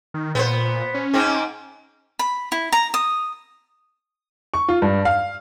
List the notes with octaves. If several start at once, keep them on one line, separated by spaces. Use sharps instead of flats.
D#3
A#2 B3 C5
C#4
G#2 C4
B5
E4
A#5
D#6
C#6
F4
G2
F5